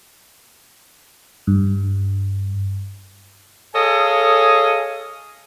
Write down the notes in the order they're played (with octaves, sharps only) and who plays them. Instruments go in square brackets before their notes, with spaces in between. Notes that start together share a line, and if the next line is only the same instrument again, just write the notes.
[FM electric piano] G2
[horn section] G#4 A4 C#5 D#5 F5 G#5